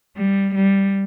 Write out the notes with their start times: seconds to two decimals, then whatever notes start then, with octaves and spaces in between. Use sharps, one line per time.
0.17 G3
0.55 G3